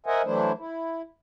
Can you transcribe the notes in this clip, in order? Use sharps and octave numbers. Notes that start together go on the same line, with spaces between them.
A#4 C5 D#5 E5 F#5 G#5
E3 F#3 A3 D4 E4 C5
E4